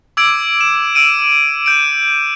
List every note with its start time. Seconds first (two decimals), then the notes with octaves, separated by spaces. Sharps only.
0.17 D6 E6 G#6 D7
0.61 E7
0.95 E6 D7 D#7
1.66 G6 D7